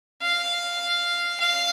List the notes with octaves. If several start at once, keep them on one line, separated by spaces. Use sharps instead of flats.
F5
F5